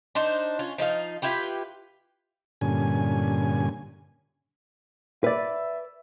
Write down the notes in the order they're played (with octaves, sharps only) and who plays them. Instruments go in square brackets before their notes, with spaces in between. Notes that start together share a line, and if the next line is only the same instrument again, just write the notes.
[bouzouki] D4 D#4 C5
C#4 F4
F3 D#4 E4 F5
E4 F4 G4 B4
[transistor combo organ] G2 A#2 D3 C#4 G#5
[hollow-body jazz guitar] B4 D5 [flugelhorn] E5